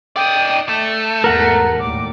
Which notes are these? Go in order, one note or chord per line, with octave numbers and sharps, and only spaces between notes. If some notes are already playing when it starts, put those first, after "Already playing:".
D#4 D5 G5 D#6
A3 A5
E2 G#2 A#4 F#5 A#5
D#2 A2 G3 D6